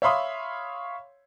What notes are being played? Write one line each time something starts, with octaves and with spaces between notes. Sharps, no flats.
C#5 E5 F5 B5 C6 D#6